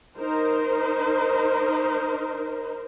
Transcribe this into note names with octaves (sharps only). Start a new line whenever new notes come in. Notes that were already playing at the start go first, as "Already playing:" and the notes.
D#4 A#4 C5